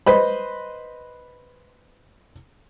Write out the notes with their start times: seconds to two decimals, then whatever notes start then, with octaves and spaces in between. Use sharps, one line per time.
0.07 B4 C5 D#5 B5